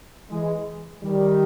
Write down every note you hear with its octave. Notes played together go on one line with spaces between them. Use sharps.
E3 G#3
D#3 G3